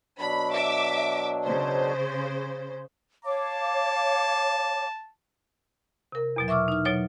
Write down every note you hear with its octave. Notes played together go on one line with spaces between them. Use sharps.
B2 F#3 D4 B5
E5 D6
C#3 C5
C#5 F5 A5 D6
C3 A#4
E2 B2 F#3
E5 C#6 D6 E6 F6
D#4 F6
B2 F#3 C#5 A6